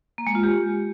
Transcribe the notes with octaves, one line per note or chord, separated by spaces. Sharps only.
A#3
G#3
F4
G4